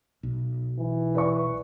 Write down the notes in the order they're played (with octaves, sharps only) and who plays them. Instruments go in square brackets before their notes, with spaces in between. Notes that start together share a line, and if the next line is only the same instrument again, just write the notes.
[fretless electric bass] B1
[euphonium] E3
[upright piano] B4 D5 C#6